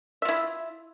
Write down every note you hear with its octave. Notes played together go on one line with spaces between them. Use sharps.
E4 F4 E5